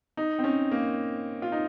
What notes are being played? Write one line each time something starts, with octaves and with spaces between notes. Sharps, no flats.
D#4
C4
C#4
A#3
F4
D#4